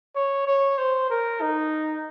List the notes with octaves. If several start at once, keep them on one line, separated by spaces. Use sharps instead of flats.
C#5
C#5
C5
A#4
D#4